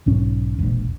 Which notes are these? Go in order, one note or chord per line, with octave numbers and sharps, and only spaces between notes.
B1 G#2 C#4
E1 A#1